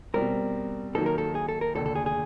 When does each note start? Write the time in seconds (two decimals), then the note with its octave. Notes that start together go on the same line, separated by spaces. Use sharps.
0.14 B2 G3 C4 A#4
0.95 D#3 F#3 A#3 D#4 A4
1.06 A#4
1.18 A4
1.35 G#4
1.49 A4
1.61 A#4
1.75 F1 D#2 D3 A4
1.86 A4
1.95 G#4
2.06 G#4